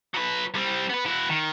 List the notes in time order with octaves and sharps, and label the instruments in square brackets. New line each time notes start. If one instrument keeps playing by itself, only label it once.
[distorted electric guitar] F#3 B4
G3 C4
B3 B4
E4 F#4
D#3